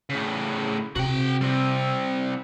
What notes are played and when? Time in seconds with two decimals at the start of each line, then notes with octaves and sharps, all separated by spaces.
0.10 A2 C#3
0.96 C3 F#4 G5
1.41 G3 C4